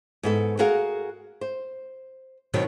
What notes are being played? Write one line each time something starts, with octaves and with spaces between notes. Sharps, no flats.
G#2 B3 A4
F#4 G#4 A#4 F5 F#5
C5
B2 D#3 F#3 B3 C4